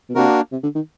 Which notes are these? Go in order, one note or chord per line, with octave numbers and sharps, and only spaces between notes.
B2
C3 A#3 D4 F#4 A#4
C3
D3
D#3